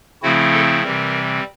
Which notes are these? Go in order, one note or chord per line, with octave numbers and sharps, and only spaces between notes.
C#3 F3 A3 C4 E4 F#4
A4
C3 E3 G3 C4 A#4